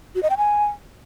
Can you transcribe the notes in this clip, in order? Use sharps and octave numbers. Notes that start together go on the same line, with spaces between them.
F#4
D#5
G5
G#5